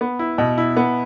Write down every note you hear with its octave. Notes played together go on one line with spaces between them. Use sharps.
B3
E4
B2
E4
B3